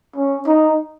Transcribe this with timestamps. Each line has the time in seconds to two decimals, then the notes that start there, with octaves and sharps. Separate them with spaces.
0.16 C#4
0.47 D#4